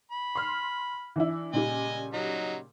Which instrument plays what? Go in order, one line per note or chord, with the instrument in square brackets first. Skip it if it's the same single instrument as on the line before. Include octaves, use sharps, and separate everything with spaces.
[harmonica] B5
[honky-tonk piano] C6 F6
E3 D4 E4
[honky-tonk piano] A#2 C#3 G3 [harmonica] D#5 G#5
[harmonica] F#3 D#4